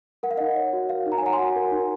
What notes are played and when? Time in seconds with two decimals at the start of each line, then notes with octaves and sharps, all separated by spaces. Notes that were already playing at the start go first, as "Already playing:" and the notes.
0.23 A#4 F#5
0.31 F5
0.37 D#4 D#5 F#5
0.56 C#5
0.73 F#4
0.89 A#4 F5
1.06 D#4
1.12 A#5
1.18 G#5
1.22 C#5 F#5 A#5
1.33 G#5 C6
1.39 F#4
1.56 A#4
1.71 D#4